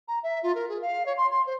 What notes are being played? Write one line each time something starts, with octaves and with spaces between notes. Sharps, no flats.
A#5
E5
F4
A#4
G#4
F5
C#5
C6
C6
C5